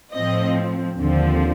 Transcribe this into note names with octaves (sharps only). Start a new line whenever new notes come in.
A2 F3 C4 D#5
D#2 D3 F3 C4